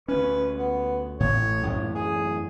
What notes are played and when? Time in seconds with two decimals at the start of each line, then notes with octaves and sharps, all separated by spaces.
0.08 D2 C#4 B4
0.58 B3
1.20 A1 A2 C#5
1.63 A1 F#2
1.95 G#4